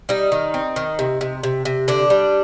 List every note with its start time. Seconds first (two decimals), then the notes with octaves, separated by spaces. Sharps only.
0.09 G3 D#4
0.32 D#3
0.54 C4
0.76 D#3
0.99 C3
1.21 C3
1.43 C3
1.65 C3
1.88 D3 D4
2.10 G3